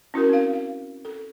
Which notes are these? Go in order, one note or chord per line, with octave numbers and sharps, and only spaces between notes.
C#4 E4 F#4 A#4
C4 F5
F5
A4